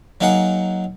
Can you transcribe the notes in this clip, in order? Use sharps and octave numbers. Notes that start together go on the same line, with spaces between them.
F#3 A#3 D#4 G#4 F#5